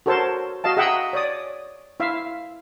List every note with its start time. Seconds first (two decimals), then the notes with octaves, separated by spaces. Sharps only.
0.06 F#4 A4 A#4 C5 C#5 A5
0.64 F#4 D#5 F5 A5
0.77 G#4 E5 F#5 G5 A#5 E6
1.13 C#5 D5 D#6
2.00 E4 E5 F5